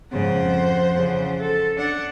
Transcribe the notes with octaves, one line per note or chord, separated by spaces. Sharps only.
G#2 C#3 F3 C5 F#5
F2
C#3 E3
A4
D4 F#5